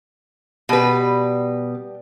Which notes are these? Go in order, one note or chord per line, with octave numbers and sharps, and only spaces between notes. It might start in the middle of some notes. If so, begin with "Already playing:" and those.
B2 G3 B4